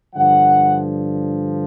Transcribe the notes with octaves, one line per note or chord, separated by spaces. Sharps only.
G2 D3 F3 F#5